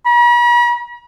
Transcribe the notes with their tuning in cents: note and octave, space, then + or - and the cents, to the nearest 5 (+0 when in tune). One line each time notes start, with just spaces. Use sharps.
B5 -45